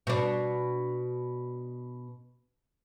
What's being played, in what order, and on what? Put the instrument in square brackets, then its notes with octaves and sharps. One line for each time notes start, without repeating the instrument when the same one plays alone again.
[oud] B2 D4